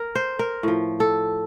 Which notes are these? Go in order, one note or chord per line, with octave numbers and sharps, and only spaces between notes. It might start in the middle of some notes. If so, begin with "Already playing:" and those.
Already playing: A#4
C5
A#4
A2 F3
A4